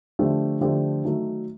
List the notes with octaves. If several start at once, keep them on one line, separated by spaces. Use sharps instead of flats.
D3 F3 A3 D4 G4
D3 F3 A3 D4 G4
D#3 F#3 A3